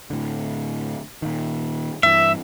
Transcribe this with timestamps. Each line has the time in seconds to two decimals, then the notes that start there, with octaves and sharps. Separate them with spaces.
0.10 A2 D3
1.22 A#2 D#3
2.03 G2 E3 E5